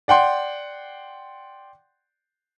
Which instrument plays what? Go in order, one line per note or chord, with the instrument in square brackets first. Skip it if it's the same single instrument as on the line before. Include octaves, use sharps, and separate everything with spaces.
[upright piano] D5 F#5 G5 C6